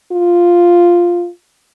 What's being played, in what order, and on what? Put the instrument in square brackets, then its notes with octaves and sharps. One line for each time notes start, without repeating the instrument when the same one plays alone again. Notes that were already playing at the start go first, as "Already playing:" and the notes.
[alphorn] F4